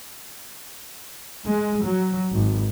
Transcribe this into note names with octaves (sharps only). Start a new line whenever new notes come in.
G#3
F#3
G#1